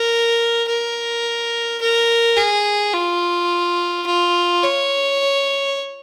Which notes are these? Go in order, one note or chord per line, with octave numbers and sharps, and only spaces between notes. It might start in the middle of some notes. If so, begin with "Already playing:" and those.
Already playing: A#4
A#4
A#4
G#4
F4
F4
C#5